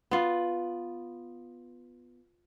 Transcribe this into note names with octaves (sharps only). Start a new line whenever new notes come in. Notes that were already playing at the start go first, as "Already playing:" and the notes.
B3 F4